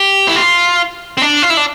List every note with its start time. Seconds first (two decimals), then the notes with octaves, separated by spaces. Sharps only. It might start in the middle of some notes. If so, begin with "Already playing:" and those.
Already playing: G4
0.28 E4
0.36 F4
1.18 C4
1.22 D4
1.42 F4
1.50 E4
1.57 D4